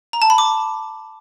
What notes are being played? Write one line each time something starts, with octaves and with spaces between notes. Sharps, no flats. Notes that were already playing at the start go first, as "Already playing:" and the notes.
A#5
A5
B5
D6